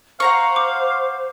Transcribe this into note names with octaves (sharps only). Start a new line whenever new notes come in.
C5 F5 F#5 A#5 C#6
D6